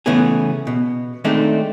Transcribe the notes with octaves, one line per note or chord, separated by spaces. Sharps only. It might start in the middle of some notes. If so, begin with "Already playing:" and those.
C#3 E3 A3 B3 C#4 G#4
B2
D#3 G#3 A3 C4 D4 D#4